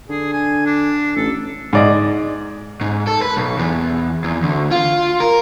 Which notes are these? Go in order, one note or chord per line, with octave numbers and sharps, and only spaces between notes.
D3 G#4
G#5
D4
A1 A4
G#2 D5 D#5
G#2
A4
B4
B1
E2
E2
D2
F4
A#4